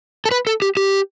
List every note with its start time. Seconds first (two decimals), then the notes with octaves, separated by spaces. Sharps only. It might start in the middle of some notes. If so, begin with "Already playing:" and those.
0.25 A4
0.31 B4
0.47 A4
0.62 G4
0.77 G4